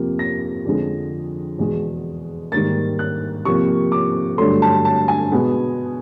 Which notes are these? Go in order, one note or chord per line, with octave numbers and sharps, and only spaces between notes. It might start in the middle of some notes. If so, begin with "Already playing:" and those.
Already playing: F2 C3 F3 A#3
A#6
F2 D3 F3 G#3
E2 B2 G#3
G#2 D#3 G3 A#3 A6
F#6
C3 F3 A#3 C#6
D6
G2 D3 F#3 A3 C6
A5
A5
G#5
B2 G#3 B3